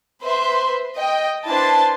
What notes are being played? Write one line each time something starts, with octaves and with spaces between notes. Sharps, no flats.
B4 C5 E5 C6
D#5 G5
D4 E4 B4 C5 A5 C6